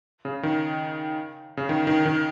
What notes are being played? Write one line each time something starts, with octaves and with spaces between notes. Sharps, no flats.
C#3
D#3
C#3
D#3
D#3
D#3